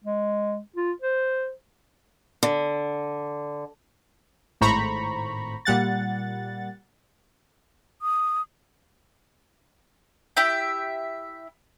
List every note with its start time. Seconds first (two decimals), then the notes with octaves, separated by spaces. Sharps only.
0.04 G#3
0.76 F4
1.02 C5
2.43 D3
4.61 G#1 A2 C5 A#5 B5 C#6
5.65 A#2 G3 F#5 A6
8.02 D#6
10.37 E4 G4 E5 G5